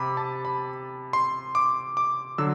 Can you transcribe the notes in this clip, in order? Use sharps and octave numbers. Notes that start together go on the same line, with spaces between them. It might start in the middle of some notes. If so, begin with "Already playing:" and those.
Already playing: C3 B5 D6
A5
B5
C6
D6
D6
D3 F#3 E6